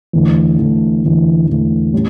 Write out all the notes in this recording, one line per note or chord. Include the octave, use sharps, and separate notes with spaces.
E2 D3 A3
E2 D3 A3
E2 D3 A3
E2 D3 A3
A2 G3 C#4